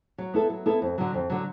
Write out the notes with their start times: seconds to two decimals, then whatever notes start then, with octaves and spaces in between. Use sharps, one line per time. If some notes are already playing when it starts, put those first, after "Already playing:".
0.18 F#3
0.34 B3 E4 A4
0.50 F#3
0.66 B3 E4 A4
0.82 F2
0.98 D3 F#3
1.14 F2
1.30 D3 F#3